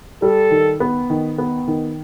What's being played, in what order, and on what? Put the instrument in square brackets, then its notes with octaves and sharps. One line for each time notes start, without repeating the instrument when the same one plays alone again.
[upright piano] G3 [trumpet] A4
[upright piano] D#3
B3
D#3
B3
D#3